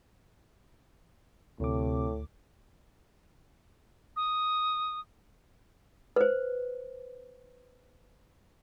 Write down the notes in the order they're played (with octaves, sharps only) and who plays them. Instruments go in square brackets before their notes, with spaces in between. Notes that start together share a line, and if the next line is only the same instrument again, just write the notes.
[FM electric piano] D2 D6 [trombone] A2 [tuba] C3
[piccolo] D#6
[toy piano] B4 C5